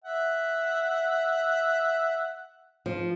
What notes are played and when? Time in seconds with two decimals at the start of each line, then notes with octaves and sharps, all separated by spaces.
0.04 E5 F#5
2.86 F3